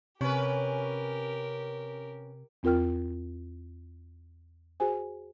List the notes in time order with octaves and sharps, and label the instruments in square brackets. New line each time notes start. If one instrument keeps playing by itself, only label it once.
[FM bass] C3 [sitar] C#4 B4 [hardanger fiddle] G4 A#4
[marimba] E2 C4 F4 A#4 G5 F6
F#4 G#4 C5 G#5